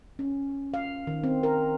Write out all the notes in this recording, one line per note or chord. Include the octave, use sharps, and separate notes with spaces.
C#4
F5
D#3
C4
A#4